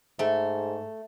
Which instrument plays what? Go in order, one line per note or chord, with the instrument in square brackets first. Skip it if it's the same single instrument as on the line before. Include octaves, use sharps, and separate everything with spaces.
[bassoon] G#2 [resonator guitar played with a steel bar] A3